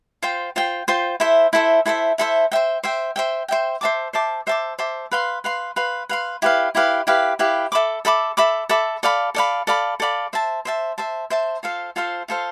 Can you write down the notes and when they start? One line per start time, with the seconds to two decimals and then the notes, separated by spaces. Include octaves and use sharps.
0.22 F4 C5 G5
0.56 F4 C5 G5
0.88 F4 C5 G5
1.20 E4 A4 C5 E5
1.53 E4 A4 C5 E5
1.86 E4 A4 C5 E5
2.18 E4 A4 C5 E5
2.52 C5 E5 G5
2.84 C5 E5 G5
3.16 C5 E5 G5
3.48 C5 E5 G5
3.81 C5 E5 A5 D6
4.13 C5 E5 A5 D6
4.47 C5 E5 A5 D6
4.79 C5 E5 A5 D6
5.12 B4 F5 C6
5.44 B4 F5 C6
5.76 B4 F5 C6
6.09 B4 F5 C6
6.42 E4 G4 B4 F5
6.75 E4 G4 B4 F5
7.07 E4 G4 B4 F5
7.39 E4 G4 B4 F5
7.72 A4 E5 B5 D6
8.05 A4 E5 B5 D6
8.37 A4 E5 B5 D6
8.69 A4 E5 B5 D6
9.03 A4 D5 F5 B5
9.35 A4 D5 F5 B5
9.67 A4 D5 F5 B5
10.00 A4 D5 F5 B5
10.33 C5 E5 A5
10.65 C5 E5 A5
10.98 C5 E5 A5
11.30 C5 E5 A5
11.63 F4 A4 C5 F5
11.96 F4 A4 C5 F5
12.28 F4 A4 C5 F5